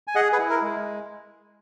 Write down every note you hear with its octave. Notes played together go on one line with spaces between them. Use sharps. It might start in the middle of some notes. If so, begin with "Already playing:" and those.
G#5
G#4 D#5 F#5
G#4 B4
E4
A#4
G#3